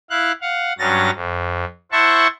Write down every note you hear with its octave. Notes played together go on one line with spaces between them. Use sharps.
E4 F5 F#6
F5 F#5
G2 F#3 C#4 A6 A#6
F2
E4 C5 E5 F#5 A5 C#6